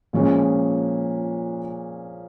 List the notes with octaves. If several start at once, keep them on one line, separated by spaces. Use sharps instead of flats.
A#2 F3 G#3 C#4